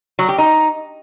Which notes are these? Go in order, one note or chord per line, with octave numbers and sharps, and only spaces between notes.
F#3
G4
D#4